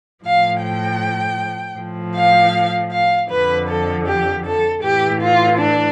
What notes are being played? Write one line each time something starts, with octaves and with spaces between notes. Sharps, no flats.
A2 F3 F5
G5
A2 F3
F5
F5
F2 D3 F3 B4
A4
G4
A4
A2 E3 G4
F4
D4